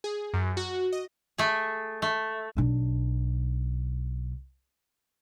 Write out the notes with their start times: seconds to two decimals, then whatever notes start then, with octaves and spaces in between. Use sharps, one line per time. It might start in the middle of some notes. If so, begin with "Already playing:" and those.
0.04 G#4
0.34 F#2
0.57 F#4
0.92 D#5
1.38 A3 G#4
2.02 A3
2.57 B1 D4